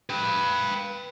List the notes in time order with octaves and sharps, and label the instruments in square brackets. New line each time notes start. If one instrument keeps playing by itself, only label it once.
[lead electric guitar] B4 G5